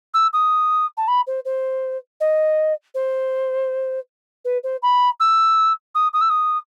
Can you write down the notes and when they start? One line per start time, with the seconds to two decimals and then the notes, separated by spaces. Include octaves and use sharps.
0.14 E6
0.33 D#6
0.97 A5
1.08 B5
1.27 C5
1.45 C5
2.20 D#5
2.94 C5
4.45 B4
4.63 C5
4.82 B5
5.20 E6
5.95 D#6
6.13 D#6
6.21 E6
6.30 D#6